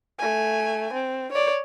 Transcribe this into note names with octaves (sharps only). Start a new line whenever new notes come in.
A3 G#5
C4
C#5 D5